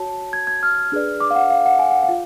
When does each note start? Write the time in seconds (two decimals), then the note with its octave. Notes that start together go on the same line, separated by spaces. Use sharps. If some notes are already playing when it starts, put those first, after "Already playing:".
Already playing: F#4 C#5 A5
0.33 G#6
0.47 G#6
0.63 F6
0.92 D4 G#4 B4 D5
1.20 D6
1.31 F5
1.35 F#5
1.50 F5
1.66 F#5
1.79 G#5
1.91 F#5
2.03 F5
2.09 F4